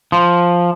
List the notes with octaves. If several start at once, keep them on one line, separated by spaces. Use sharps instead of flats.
F3